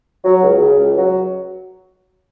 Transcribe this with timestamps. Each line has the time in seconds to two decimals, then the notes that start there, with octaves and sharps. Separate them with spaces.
0.25 F#3
0.43 C#2
0.61 C#3
0.79 C#2
0.98 F#3